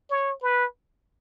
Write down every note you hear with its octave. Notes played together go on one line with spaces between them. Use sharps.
C#5
B4